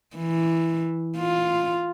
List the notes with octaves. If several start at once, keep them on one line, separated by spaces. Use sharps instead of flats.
E3
F4